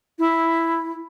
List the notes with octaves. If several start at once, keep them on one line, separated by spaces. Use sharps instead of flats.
E4